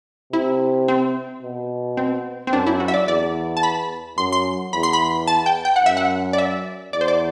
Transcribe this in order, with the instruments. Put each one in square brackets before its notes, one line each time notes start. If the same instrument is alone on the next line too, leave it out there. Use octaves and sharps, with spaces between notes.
[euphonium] C3 [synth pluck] E4
[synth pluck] C4
[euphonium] B2
[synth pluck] C4
C4
[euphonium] F#2 [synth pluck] D4
[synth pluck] E4
F#4
E5
D5
[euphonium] E2 [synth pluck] D5
[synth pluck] A5
B5
[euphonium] F#2 [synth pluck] C6
[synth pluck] C6
[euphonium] E2 [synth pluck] B5
[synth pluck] C6
B5
A5
G5
G5
F#5
[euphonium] F#2 [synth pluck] E5
[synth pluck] F#5
D5
E5
[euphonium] E2 [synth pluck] D5
[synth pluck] C5
D5